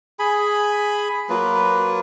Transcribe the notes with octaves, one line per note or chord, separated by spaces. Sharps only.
G#4 G#5 B5
F#3 A#3 F4 B4